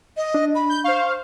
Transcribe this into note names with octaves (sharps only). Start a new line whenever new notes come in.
D#5
D4
B5
G6
C5 F5 C#6